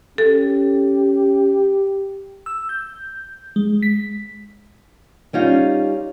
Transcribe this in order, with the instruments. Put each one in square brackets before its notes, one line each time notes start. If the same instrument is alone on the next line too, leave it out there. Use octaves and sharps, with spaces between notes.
[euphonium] C#4 [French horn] G4 [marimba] A4
[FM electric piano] E6
G6
G#3
B6
[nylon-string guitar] G3 C#4 D#4 F4